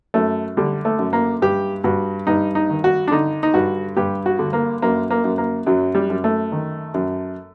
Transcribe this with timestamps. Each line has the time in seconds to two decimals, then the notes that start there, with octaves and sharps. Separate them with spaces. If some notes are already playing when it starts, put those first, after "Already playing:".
0.14 F#2 A3
0.57 D3 G3
0.85 A3
0.99 F#2
1.13 A#3
1.42 G2 G4
1.84 G2 F#4
2.27 G2 D#4
2.55 D#4
2.70 D#3
2.84 F#4
3.08 D4
3.11 D3 D#4
3.43 D#4
3.54 G2 F#4
3.97 G2 G4
4.26 F#4
4.39 D3
4.53 A#3
4.82 F#2 A#3
5.10 A#3
5.24 F#2
5.38 A#3
5.67 F#2 F#3
5.95 G3
6.10 F#2
6.24 A3
6.52 D#3
6.94 F#2